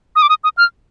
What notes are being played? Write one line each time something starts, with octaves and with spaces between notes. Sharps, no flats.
D#6
D6
D#6
D#6
F6